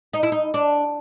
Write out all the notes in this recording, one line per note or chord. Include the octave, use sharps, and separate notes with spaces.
D#4
E4
D#4
D4